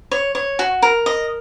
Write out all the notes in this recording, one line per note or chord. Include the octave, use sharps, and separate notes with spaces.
C#5
C#5
F#4
A#4
D#5